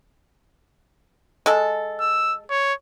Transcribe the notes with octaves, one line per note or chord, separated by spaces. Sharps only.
G#3 A4
E6
C#5